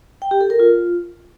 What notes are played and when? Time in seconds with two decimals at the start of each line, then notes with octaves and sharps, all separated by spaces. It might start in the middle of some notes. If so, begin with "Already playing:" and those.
0.22 G5
0.31 G4
0.41 A4
0.50 A#4
0.59 F4